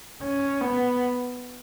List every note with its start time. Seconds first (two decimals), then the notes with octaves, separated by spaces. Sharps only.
0.23 C#4
0.61 B3